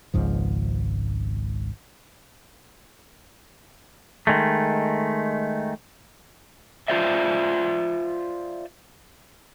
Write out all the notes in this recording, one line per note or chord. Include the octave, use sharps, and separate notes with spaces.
G#1 C#2 G#2 F3
D#3 G#3 A3
F4 C5 D5 E5